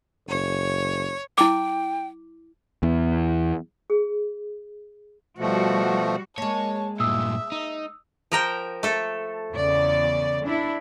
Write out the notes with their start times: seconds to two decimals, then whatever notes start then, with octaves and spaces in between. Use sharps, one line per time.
0.27 F#1 C#5
1.38 E4 G5 D6
2.83 E2
3.90 G#4
5.38 B2 F3 G3 A3 F#4
6.38 G#3 A#3 C#5 A5
7.00 G2 A#2 E5 D#6 E6
7.52 D#4
8.32 F3 A#4 G5
8.83 A3 A4
9.54 E2 C#3 D5
10.46 D4 E4